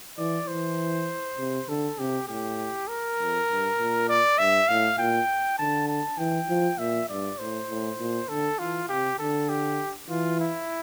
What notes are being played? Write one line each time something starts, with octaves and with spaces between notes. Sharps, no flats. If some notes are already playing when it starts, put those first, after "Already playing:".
E3 D5
E3 C5
C3
D3 A4
C3 G4
A2 G4
A#4
F2
G2
A#2
D5
G2 E5
A2 F5
A#2 G5
D3 A5
A5
E3 G5
F3
A#2 E5
G2 D5
A2 C5
A2
A#2
D3 A4
E3 F4
C3 G4
D3 A4
G4
E3 F4
E4